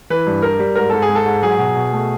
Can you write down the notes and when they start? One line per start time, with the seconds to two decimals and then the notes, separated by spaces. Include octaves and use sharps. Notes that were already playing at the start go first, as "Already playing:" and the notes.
0.10 E3 B4
0.27 G2
0.42 G3 A#4
0.59 G3
0.75 G#2 A#4
0.90 G#2 A4
1.02 G#4
1.09 G#3
1.15 A4
1.25 G#2
1.43 F#3 G#4
1.58 B2
1.75 B2
1.92 A3